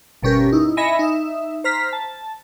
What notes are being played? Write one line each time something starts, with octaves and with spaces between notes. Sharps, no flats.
G1 B2 C#4 G4 A#4
D#4 E4
D#5 E5 G#5 B5 A#6 C#7
D#4 E5
C5 A#5 F6 B6
A5